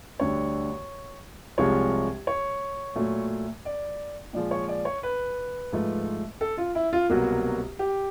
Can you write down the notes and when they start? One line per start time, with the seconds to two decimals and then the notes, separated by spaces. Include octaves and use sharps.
0.20 D2 D3 G3 C#5
1.58 C2 C3 F3 G#3 C#5
2.27 C#5
2.95 A#2 F#3 A3
3.65 D5
4.33 A#2 F3 G#3 D5
4.51 C#5
4.68 D5
4.85 C#5
5.03 B4
5.72 G#2 F3 A3
6.41 A4
6.57 F4
6.75 E4
6.93 F4
7.10 C2 B2 F#3 A#3 F#4
7.79 G4